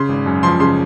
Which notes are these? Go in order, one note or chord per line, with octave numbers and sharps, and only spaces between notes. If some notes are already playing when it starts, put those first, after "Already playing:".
Already playing: C#3 C6
G#1
F#2
F3 C6
C#3 C6